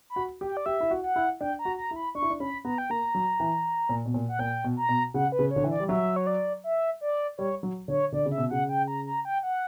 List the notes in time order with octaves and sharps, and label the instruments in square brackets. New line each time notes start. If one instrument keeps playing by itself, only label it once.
[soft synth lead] B5
[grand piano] F#4
G4
[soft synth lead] G5
D5
[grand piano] G4 [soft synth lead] E5
[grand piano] E4
F#4
[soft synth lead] F#5
[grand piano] E4
[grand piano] D4 [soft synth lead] G5
[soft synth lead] A#5
[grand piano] F#4
[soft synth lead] A#5
[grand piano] E4
[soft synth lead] B5
[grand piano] D4 [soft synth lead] C#6
[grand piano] E4
D4
[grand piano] C#4 [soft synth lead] B5
[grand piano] B3 [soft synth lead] A#5
[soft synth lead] G5
[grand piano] A#3 [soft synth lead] A#5
[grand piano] F#3
E3
A#2
B2
A#2
[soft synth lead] F#5
[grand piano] A#2 [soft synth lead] G5
[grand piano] B2
[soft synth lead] A#5
[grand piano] B2
[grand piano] C#3 [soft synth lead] F#5
[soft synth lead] B4
[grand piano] C#3
[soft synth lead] C#5
[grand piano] D3
E3
[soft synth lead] D5
[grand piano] G3
[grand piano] F#3 [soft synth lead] E5
[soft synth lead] C#5
D5
E5
D5
[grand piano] G3 [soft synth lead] C#5
[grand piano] F#3
[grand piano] D3 [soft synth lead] C#5
[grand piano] D3 [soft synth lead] D5
[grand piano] C#3
[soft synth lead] E5
[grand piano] B2
[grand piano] C#3 [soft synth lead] F#5
[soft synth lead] G5
A#5
A#5
G5
F#5